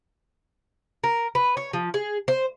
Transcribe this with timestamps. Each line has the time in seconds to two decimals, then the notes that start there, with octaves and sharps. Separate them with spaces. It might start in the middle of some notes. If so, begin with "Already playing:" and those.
1.04 A#4
1.35 B4
1.57 C#5
1.73 F3
1.94 G#4
2.28 C5